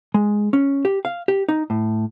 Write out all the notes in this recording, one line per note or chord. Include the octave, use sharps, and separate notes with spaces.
G#3
C#4
G4
F5
G4
D#4
A2